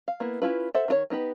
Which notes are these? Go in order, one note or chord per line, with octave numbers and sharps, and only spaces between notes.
F5
A#3 B3 E4
C#4 E4 F4 B4
A4 C5 E5 F#5
D#3 F4 C#5
B3 D#4 G4 B4